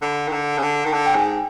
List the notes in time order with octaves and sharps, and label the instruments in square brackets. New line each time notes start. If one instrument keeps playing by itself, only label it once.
[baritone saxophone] D3 [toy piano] B5
[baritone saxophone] D#3
[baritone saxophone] D3 [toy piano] A#5
[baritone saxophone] C#3
[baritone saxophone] D3 [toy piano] A5
[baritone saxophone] D#3
[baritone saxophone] D3 [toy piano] A5
[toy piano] G5
[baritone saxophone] G#2 [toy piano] G#5